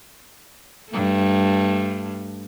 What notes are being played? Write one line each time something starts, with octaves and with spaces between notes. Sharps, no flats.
G2 A3